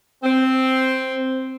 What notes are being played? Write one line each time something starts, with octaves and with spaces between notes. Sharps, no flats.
C4